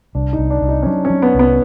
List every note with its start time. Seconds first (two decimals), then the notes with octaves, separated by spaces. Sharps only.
0.15 C2 D4
0.33 D#4
0.39 C2
0.50 D4
0.62 C2
0.69 D#4
0.83 C#4
0.86 F#3 D4
1.05 C#4
1.10 F#3
1.22 B3
1.35 C2 B3